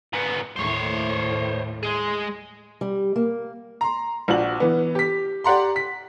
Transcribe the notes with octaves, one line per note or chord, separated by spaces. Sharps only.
G#2 B3
D#2 A2 C5 C#5
G#3 G#4
G3
A#3
A#5 C6
A#1 F3 F#4 F#7
E3 B3
G4 B6
G4 D5 F#5 A#5 C6
B6